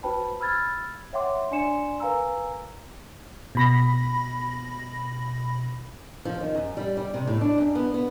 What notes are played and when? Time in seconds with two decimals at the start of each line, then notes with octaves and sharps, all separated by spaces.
0.03 F#4 B4 C5 G5 A5 B5
0.40 B5 E6 F6 G#6 A6
1.13 C#5 E5 F#5 G5 C6 D6
1.51 D4 D5 G#5 C6 C#7 E7
2.00 A#4 B4 F5 G#5 A#5 E6
3.55 B2 B5 A#6
6.25 F3
6.40 D#3
6.55 F#2
6.77 G3
6.97 G3
7.14 C3
7.27 A2
7.41 D4
7.58 F#2
7.75 B3
7.94 B3